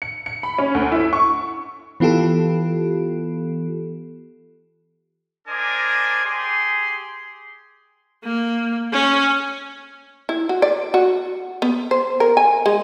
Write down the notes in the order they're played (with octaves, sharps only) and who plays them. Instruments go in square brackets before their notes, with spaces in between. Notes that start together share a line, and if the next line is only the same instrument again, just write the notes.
[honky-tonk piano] C#7
C#7
B5
C#4
D2
E4
C#6
[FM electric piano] E3 B3 F4 G4 A4
[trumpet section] D4 A#4 C5 D5 D#5 G#5
G4 G#4 C6
[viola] A#3
C#4
[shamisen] E4
F#4
D5
F#4
B3
C5
A#4
G#5
G#3